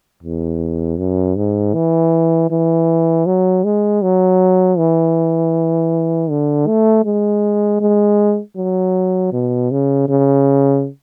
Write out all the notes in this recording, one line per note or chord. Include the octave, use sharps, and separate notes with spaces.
E2
F#2
G#2
E3
E3
F#3
G#3
F#3
E3
D3
A3
G#3
G#3
F#3
B2
C#3
C#3